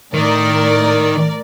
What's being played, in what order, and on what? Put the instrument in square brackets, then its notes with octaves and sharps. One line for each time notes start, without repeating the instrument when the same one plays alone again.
[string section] A2 A#4 D5 [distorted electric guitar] D#3